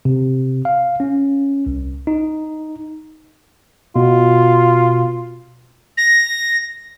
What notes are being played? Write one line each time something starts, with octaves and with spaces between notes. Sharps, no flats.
C3
F5
C#4
C2
D#4
B2 F4
A#6